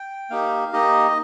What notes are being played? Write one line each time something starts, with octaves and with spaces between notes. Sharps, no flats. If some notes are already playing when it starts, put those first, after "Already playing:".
Already playing: G5
A#3 D#4 G4 F5
A#3 D#4 G4 D#5